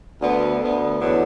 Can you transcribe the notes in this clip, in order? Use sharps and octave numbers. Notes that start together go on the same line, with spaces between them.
D2 D3 B3
D2 D3 B3
E2 D3 F#3 B3